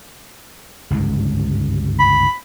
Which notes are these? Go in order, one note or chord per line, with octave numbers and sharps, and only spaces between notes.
G1 C#2 G#2
B5